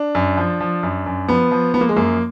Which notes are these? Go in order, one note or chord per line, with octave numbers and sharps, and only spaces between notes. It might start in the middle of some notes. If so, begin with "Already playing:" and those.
Already playing: D4
F#2
F3
F3
F#2
F#2
F3 B3
F3
F3 B3
A#3
G#3
F#2 A#3